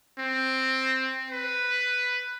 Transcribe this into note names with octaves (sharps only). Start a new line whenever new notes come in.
C4
B4